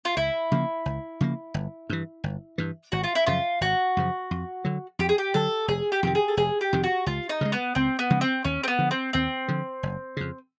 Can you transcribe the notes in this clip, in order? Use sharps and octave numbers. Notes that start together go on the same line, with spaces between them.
F4
C#2 E4
C#3 F3 A#3
C#2
C#3 F3 A#3
G1
G2 E3
G1
G2 E3
G#1 F#4
F4
E4
F#2 C#3 F3 F4
G#1 F#4
F#2 C#3 F3
F2
D3 F#3
F2 G4
G#4
G4
D3 F#3 A4
F1 G#4
G4
F2 C3 D#3 G4
G#4
A4
F1 G#4
G4
F2 C3 D#3
F#4
C#2 F4
D#4
C#3 F3 G#3
B3
C#2 C4
B3
C#3 F3 G#3
C4
D#2 C#4
C4
B3
D3 F3
C4
D#2 C4
D3 F3
F#1
F2 C#3